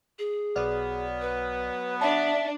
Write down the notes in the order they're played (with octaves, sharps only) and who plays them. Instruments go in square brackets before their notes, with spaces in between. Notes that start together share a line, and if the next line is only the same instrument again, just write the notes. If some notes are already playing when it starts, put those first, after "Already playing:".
[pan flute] G#4
[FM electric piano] B1 D5 F6 [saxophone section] F#3 B3
[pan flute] B4
[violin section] D4 [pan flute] E5 [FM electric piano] A5